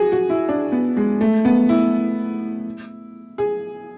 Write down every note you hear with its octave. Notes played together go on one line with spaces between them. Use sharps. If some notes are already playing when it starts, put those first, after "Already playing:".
Already playing: F#4 G#4
F#4
E4
D4
B3
G#3
A3
B3
E4
G#4